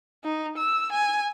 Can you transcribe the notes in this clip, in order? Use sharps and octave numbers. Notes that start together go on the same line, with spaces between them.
D#4
E6
G#5